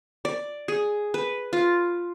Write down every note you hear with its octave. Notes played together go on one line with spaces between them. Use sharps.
D5
G#4
B4
F4